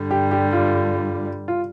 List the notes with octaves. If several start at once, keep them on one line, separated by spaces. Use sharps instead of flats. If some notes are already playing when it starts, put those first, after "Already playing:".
Already playing: G2 D3 G3
G4
G4
F4
F4